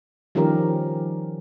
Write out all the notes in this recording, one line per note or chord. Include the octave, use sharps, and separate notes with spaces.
D#3 F3 G3 C#4 G4 A#4